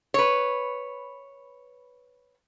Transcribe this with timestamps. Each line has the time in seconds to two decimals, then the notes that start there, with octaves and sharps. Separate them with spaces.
0.14 B4 C#5